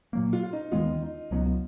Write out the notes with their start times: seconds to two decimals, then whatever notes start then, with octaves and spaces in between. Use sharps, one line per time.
0.13 A#2 F#3 A#3
0.33 F4
0.43 F4
0.53 D#4
0.72 D#2 D#3 G#3 B3 F4
1.02 D#4
1.31 C#2 B2 F#3 B3 D#4
1.46 F4